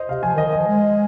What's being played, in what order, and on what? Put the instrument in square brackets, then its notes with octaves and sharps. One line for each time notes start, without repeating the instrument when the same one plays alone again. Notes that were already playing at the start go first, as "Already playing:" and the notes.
Already playing: [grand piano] C5 D#5
[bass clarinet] C3 [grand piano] F5
[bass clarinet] F3 [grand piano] G#5
[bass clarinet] D#3
[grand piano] D#5
[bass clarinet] D#3
[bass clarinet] F3 [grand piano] D#5
[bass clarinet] G#3